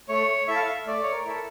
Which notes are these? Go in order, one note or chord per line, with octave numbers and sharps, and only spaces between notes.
A3 C#5
E4 A4 E5
F5
E5
A3 D5
C#5
A#4
E4 A4